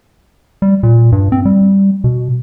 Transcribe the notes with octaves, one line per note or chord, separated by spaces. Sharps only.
G3
A#2
G2
C4
G3
B2